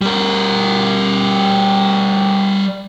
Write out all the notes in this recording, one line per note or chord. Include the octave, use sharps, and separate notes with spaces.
G3 A#4